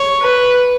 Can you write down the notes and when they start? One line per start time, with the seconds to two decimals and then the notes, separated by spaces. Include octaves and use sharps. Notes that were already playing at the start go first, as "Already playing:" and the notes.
Already playing: C#5
0.22 B4